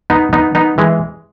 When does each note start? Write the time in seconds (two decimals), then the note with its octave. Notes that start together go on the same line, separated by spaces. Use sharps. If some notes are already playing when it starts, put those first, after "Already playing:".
0.10 B3 D#4
0.33 B3 D#4
0.55 B3 D#4
0.78 E3 G#3